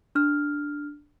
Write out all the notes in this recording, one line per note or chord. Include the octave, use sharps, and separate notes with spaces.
D4 F6